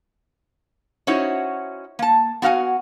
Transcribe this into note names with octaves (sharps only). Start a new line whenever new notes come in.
C#4 D#4 E4 F#4 C5 C#5
A#3 A5
B3 F#4 F5 F#5 G#5